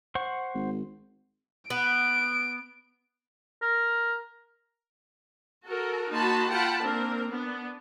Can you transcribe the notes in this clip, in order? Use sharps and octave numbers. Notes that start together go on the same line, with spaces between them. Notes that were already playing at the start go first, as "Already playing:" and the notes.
C5 F#5 C#6
G#1
B3 D7
A#4
F#4 A4 A#4
A#3 D#4 F#4 A5 B5 C6
F4 F#5 G5 A5 B5
A#3 C4 D4 A#4
B3 D4